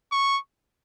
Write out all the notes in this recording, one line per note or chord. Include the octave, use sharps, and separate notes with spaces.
C#6